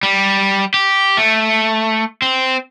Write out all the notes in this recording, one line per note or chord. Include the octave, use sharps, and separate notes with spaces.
G3
G4
A3
C4